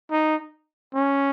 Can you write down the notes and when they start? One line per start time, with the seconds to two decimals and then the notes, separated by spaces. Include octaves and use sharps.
0.11 D#4
0.94 C#4